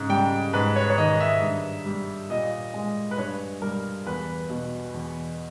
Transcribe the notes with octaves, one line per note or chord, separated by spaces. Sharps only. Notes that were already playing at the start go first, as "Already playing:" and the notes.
Already playing: G#2 C#3
G3 G5
G#2 B4
C#5
C#5
D#3 D#5
E5
G2
G3
A#2 D#5
G#3
B4
G2 C#5
G3 A#4
E2 B4
B2
E2